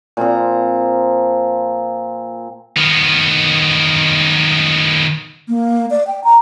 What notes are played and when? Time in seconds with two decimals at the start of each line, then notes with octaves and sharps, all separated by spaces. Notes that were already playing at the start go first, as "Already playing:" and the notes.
0.17 A#2 F3 C4 A#5
2.77 D#3 B3
5.48 A#3
5.90 D5
6.07 G5
6.24 A#5